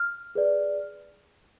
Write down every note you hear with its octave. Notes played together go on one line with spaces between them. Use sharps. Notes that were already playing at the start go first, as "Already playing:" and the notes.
Already playing: F6
G#4 B4 D5